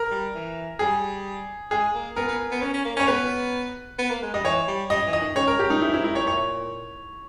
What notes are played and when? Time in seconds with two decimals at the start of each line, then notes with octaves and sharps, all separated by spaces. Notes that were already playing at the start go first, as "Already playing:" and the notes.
Already playing: A#4
0.11 G3
0.35 E3
0.79 G3 G#4
1.71 G#3 G#4
1.94 A#3
2.16 B3 A#4
2.28 B3
2.51 B3
2.62 C#4
2.74 C#4
2.85 A#3
2.97 C#4 C#5
3.07 B3 B4
3.99 B3
4.10 A#3
4.22 G#3
4.34 G3 D#5
4.44 E3 C#5
4.68 G3
4.90 G3 D#5
5.06 E3
5.13 D#5
5.20 D#3
5.36 C#3 C#5
5.48 A#4
5.58 C#3 G4
5.70 D#4
5.82 G#2 E4
5.94 E4
6.04 A#2 E4
6.15 C#5
6.27 C#5